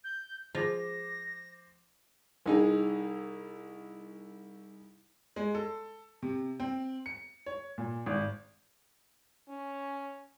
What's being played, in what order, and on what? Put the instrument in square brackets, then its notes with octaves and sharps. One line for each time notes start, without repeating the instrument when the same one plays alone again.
[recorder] G6
[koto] F3 G#3 F4 [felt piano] C5 D6 [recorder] A#6
[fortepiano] C2 D#4 G#4
[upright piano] G#3
A4
C3
C4
C#7
C#5
A#2
G#1
[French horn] C#4